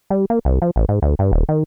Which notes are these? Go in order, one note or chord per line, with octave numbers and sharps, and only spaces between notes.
G3
A#3
C2
F3
A1
G#2
D2
G2
D#1
D#3